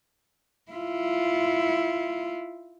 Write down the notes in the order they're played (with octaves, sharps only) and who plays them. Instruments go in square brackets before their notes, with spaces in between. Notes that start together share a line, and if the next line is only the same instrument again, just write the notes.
[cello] E4 F4